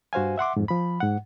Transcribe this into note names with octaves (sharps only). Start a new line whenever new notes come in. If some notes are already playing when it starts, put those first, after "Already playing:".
G2 F#4 C5 F5 G#5
E5 F#5 C6 D6
F2 G#2
F3 B5
G#2 F#5